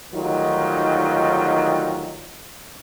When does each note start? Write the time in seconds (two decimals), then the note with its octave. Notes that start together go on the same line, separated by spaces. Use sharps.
0.13 D2 D#3 F#3 G3 D#4 F4